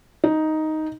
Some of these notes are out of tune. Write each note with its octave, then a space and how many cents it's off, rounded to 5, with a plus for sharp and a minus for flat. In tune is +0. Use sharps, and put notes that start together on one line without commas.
D#4 +5